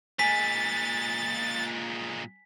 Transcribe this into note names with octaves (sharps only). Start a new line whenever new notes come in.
A#2 G#3 G#5 A6 B6